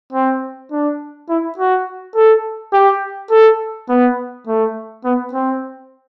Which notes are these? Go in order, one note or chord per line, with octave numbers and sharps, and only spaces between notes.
C4
D4
E4
F#4
A4
G4
A4
B3
A3
B3
C4